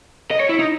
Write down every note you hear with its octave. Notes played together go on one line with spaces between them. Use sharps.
D#5
C#5
E4
D#4